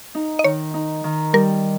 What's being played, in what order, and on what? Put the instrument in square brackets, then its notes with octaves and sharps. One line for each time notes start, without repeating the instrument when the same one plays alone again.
[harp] D#4
[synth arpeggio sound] D#5
[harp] D#3 [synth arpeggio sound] C#5
[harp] D#4
D#3
[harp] G3 [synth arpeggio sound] A#4